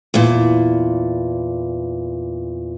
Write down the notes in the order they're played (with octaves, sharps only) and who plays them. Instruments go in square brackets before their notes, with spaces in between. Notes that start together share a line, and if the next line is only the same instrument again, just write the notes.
[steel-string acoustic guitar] E2 A#2